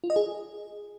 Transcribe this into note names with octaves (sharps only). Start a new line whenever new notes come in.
F4
D#5
G#4